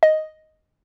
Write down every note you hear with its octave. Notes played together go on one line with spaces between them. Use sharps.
D#5